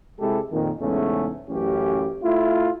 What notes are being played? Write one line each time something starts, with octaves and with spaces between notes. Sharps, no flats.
C3 G#3 E4 G4 A4
F2 A#2 D#3
E2 G#2 C#3 A3 C#4
A1 F#2 A2 C#4 G4
A3 E4 F4